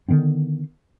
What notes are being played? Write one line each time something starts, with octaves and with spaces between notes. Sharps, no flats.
D3 D#3 B3 C4